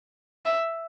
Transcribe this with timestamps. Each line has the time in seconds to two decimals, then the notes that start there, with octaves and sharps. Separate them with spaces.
0.45 E5